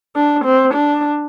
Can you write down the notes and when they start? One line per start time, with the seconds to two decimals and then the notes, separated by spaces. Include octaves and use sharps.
0.16 D4
0.45 C4
0.74 D4